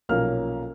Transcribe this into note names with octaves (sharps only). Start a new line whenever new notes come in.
B1 A#2 F3 A#3 C#4 F6